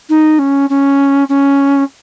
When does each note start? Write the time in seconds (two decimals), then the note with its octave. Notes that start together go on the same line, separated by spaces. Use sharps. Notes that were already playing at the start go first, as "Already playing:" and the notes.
0.10 D#4
0.39 C#4
0.70 C#4
1.29 C#4